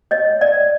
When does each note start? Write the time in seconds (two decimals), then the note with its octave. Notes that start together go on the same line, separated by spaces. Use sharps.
0.11 C#5 D#5
0.41 D5 E5